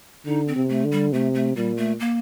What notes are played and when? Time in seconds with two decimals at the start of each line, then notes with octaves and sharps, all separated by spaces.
0.26 D3 D#4
0.48 C4
0.56 C3
0.69 A3
0.84 D3
0.92 G3
1.12 C3 A3
1.34 A3
1.56 A#2 G3
1.77 A3
2.00 A#3